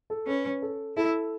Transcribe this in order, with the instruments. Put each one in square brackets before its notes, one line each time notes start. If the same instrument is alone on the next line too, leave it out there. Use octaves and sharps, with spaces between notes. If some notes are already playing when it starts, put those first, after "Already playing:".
[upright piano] A4
[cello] C#4 [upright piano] B4
[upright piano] A4
[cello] E4 [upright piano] A4